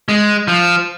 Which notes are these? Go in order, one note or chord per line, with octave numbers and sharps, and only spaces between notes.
G#3
F3